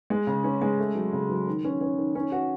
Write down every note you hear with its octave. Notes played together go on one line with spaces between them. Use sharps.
G#3
C#3
C#4
G#3
A3
F#3
C#3
F#3
D#3
C#4
C#4
D#3
C#4
F#4